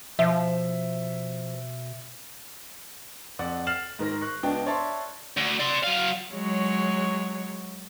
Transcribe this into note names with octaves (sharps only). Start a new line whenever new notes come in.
B2 F3 E5
F2 D5 F#5
F6 A6 C7 E7 F#7
G#2 D#3 A#4 A#6
C#6 F#6
C#2 B3 D4 G5
C#5 D5 E5 A5 C6
D2
D5 C6
F#3 F5
F#3 G#3 C#5